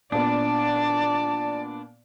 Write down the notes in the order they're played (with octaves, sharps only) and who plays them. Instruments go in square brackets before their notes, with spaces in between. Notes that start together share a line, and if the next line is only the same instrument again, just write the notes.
[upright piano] A#2 B3 [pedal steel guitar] D4 [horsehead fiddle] D5 [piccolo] A5